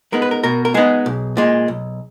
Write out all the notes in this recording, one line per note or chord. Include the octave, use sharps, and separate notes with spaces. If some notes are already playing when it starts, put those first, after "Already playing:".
G#3 B3 D#4 A#4
B4
A#4
B2 A#4
A#4
G#3 B3 D#4 G#4
B1
A#2 G#3
B1